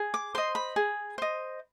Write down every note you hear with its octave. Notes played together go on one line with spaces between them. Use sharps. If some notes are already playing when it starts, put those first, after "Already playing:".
Already playing: G#4
D6
C5 D#5 C6
B5
G#4
C5 D#5